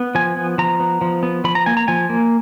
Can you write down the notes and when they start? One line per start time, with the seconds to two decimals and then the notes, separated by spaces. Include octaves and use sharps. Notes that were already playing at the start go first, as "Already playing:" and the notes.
Already playing: B3
0.15 F3 G#5
0.36 B3
0.58 F3 A#5
0.80 B3
1.01 F3
1.23 B3
1.44 F3 B5
1.55 A#5
1.66 A#3 G#5
1.77 A#5
1.88 F3 G#5
2.10 A#3